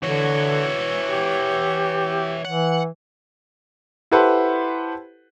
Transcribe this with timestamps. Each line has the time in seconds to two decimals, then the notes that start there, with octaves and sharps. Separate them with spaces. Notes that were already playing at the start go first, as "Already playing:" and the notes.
0.04 D3 E3 F#4 C#5
1.07 G4
2.45 E3 F#5
4.11 E4 G4 A4 B4 C5 F#5